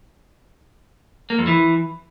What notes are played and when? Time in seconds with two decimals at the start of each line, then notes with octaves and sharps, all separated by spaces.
1.30 A#3
1.39 F2
1.47 E3